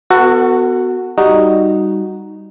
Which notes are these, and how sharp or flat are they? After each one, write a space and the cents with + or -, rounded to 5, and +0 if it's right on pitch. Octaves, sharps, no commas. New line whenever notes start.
B3 +15 F#4 +0 A4 +40
G3 +0 D#4 +0 F#4 +0